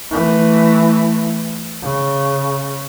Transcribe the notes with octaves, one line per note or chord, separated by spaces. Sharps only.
E3 A3
C#3